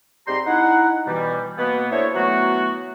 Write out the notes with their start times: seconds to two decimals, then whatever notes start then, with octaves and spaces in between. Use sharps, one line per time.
0.27 G#2 G3 C4 G4 A#5 C6
0.47 D#4 E4 F#5
1.07 B2 E3 G3
1.57 B2 A#3 B3
1.92 D4 E4 A4 C5 C#5
2.15 E3 F#3 A3 B3 F#4